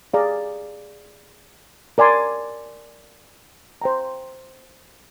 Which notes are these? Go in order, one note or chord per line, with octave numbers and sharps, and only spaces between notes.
G#4 D5 F5 A#5
A#4 D5 G#5 C6
C5 G5 A#5